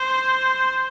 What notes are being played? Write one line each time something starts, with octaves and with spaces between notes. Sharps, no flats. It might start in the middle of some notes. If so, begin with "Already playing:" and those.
Already playing: C5